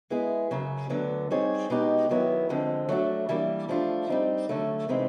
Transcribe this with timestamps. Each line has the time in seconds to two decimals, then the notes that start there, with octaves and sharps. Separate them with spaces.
0.10 G#3 B3 E4 G#4
0.51 F#2 C#3 F#3
0.89 D2 D3 F#3 B3 D4
1.30 G3 C4 D#4 G#4 C#5
1.70 B2 G#3 B3 D#4 G4
2.09 F#2 D#3 F#3 B3 E4
2.49 F2 D3 F3 G#3 C4
2.89 F#3 A3 D4 F#4
3.29 E3 G3 A#3 D4
3.69 F3 A3 D4 F4
4.09 G3 C4 D#4
4.49 D3 F#3 A3
4.88 C3 E3 G#3 C4 D#4